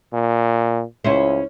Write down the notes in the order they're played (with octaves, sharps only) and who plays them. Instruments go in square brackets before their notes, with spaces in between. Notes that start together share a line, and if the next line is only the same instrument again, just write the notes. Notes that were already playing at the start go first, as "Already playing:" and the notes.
[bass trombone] A#2
[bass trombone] C#2 [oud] C#4 E4 C5